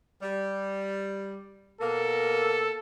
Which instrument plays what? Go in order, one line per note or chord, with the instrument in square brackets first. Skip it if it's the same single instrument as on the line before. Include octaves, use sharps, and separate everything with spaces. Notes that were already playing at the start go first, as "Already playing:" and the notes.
[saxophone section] G3
[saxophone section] B2 A#3 [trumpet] A4